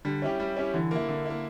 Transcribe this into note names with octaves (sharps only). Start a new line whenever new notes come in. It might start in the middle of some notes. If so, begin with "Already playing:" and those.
D3 G3
C#4 E4 G4
G3
C#4 E4 G4
D3 E3
A#3 E4
D3
A#3 E4